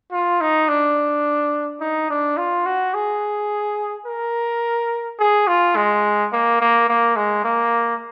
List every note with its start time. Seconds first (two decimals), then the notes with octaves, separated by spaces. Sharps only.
0.12 F4
0.41 D#4
0.68 D4
1.81 D#4
2.10 D4
2.37 F4
2.66 F#4
2.94 G#4
4.06 A#4
5.19 G#4
5.47 F4
5.76 G#3
6.32 A#3
6.61 A#3
6.89 A#3
7.16 G#3
7.44 A#3